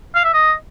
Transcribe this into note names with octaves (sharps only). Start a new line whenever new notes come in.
F5
E5
D#5